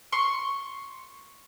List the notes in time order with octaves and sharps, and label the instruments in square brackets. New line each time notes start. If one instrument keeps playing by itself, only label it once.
[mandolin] C6 C#6